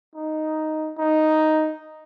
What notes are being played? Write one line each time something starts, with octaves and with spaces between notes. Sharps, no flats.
D#4
D#4